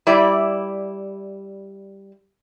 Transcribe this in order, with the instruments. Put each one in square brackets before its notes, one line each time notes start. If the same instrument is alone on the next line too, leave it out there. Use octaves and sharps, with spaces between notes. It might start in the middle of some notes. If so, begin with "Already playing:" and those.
[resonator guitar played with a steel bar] G3 E4 D5